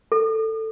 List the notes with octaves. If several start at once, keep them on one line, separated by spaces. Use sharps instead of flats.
A4